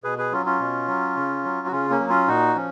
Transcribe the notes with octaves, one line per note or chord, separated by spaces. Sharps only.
B2 G#4 B4
G#4 B4
F#3 C#4 F4
C#4 F4
B2
F#3
C#3
F#3
F#4
C#3 C#4 F4
A#3 C#4
F#3
C#4 F4
A#2 D#4 F#4
F3 C#4